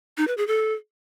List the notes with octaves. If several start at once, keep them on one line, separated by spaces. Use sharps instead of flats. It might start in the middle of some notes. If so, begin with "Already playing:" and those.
D#4
B4
G#4
A4